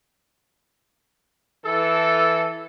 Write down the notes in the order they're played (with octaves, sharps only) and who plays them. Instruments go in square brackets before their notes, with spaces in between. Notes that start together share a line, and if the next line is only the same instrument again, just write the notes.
[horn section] E3 A4